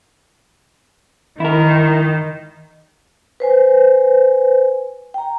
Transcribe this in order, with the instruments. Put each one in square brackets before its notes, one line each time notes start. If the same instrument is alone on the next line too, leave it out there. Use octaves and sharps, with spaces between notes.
[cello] D#3 [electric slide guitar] E4 A#4
[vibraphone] B4 C5 G#5
G5 A#5